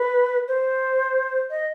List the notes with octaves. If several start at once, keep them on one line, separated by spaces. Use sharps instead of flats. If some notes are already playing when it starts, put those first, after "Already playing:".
Already playing: B4
C5
D#5